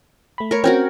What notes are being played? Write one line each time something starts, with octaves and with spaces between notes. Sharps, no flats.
A3 B5
A#4 C#5
C4 C#4 F#4 A#4 C#5 G5